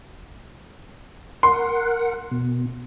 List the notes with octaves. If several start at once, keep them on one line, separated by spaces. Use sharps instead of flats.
A#4 F#5 C6
B2